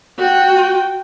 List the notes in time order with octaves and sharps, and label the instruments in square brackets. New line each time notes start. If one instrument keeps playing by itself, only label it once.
[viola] F#4 G5